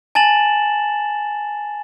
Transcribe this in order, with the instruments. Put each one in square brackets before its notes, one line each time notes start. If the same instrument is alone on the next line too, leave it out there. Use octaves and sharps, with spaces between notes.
[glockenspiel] G#5 A5 A6 E7 F#7